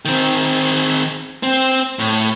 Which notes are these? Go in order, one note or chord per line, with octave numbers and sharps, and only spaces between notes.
D#3 C4
C4
A2